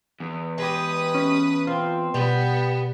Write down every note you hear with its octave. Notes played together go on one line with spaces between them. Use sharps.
E2
G#3 G4 B4 D#6
C#4
C4 F4
B2 G3 B3